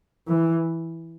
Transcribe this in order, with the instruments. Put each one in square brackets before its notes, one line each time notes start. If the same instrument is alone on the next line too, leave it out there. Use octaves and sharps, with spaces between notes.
[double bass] E3